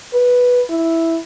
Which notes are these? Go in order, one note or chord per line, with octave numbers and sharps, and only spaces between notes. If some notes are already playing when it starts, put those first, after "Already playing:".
B4
E4